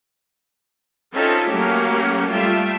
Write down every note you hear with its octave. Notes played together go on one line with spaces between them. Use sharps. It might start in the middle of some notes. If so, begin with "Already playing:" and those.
C4 C#4 D#4 F4 A4 E5
F#3 A3 A#3 C#4 G4
G3 A3 F4 E5 G5